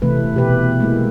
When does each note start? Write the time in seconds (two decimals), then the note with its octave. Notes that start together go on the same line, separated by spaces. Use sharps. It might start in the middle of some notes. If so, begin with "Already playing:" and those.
0.02 C3 E3 A3 B4
0.34 B2 G4 B4
0.80 G#3 A#3 E4